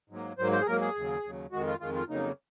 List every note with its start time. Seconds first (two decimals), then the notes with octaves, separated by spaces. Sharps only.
0.10 G#2 F#3 A#3
0.38 G#2 F#3 A#3 C5
0.52 C5
0.61 G#4
0.67 G#2 F#3 A#3 A#4
0.81 G#4
0.95 D#2 C#3 F#3
1.24 D#2 C#3 F#3
1.52 F2 D#3 G#3 F#4
1.67 F4
1.80 F2 D#3 G#3 F4
1.95 F4
2.09 F2 C#3 F#3 A#3 D#4